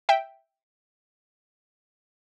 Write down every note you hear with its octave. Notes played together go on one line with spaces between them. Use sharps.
E5 G5